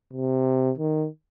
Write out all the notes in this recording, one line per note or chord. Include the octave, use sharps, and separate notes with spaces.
C3
D#3